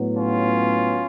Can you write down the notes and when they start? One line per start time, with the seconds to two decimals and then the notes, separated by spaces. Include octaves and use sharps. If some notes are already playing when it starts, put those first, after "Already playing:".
Already playing: A2 F#3 B3
0.18 C#4 F4